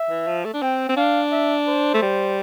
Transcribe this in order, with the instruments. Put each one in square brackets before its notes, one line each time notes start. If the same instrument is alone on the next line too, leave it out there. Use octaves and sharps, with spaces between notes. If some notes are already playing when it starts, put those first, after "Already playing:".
Already playing: [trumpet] E5
[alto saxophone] E3
F3
A3
D4
[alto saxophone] C4 [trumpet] G5
[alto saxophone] C4
[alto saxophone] D4 [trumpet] F5
[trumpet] E5
C5
[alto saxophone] A3
G3